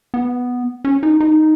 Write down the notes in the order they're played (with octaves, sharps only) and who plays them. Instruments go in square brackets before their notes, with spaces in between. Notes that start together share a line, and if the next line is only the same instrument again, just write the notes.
[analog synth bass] B3
C#4
D#4
D#4